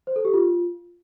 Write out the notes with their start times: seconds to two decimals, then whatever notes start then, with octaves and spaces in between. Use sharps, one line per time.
0.07 C5
0.16 A4
0.25 G4
0.33 F4